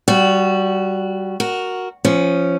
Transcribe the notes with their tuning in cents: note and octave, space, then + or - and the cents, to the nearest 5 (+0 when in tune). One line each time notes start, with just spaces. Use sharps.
G3 -20 F#4 +0
F#4 +0 A#4 +0
F3 -15 C#4 +0